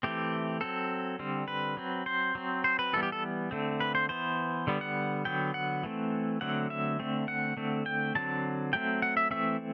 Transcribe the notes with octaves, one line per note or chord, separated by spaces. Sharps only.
E3 A3 C4 G4
F#3 C4 A4
D3 G3 C4
B4
F#3 C4
C5
F#3 C4
C5
B4
E3 G3 B3 A4
G4
A4
D3 A3 C4
B4
C5
E3 B3 C5
D3 G3 B3
F#5
D3 F#3 B3 G5
F#5
E3 A3 C4
D3 F#3 A3 C4 F#5
E5
D3 A3 C4
F#5
D3 A3 C4
G5
D3 F#3 C4 A5
F#3 A3 C4 G5
F#5
E5
E3 A3 C4 E5